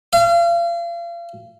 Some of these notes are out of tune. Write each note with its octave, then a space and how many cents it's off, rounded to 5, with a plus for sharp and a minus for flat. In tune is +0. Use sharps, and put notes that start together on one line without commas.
F5 -35